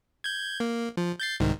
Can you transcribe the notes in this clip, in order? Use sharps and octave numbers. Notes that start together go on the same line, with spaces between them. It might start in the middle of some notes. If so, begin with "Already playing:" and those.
G6 G#6
A#3
F3
G6 A6 C7
C2 G#2 D#3